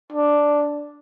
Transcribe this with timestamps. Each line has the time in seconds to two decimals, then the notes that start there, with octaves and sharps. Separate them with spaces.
0.12 D4